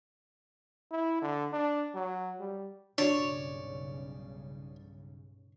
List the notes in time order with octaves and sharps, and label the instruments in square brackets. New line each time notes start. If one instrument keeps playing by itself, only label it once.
[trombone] E4
D3
D4
F#3
G3
[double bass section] B1 G2 C#3 [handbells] D4 F#4 [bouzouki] C#5 [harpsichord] D5